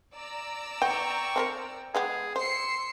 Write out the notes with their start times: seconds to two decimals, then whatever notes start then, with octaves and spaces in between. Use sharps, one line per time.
0.15 D5 A#5 E6
0.82 B3 G5 C#6
1.36 C4 A4 A#4
1.95 G#3 B3 G4 G#4
2.36 C5 C6 E6 C7 C#7